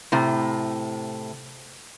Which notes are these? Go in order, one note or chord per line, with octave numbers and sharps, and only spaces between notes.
A2 C3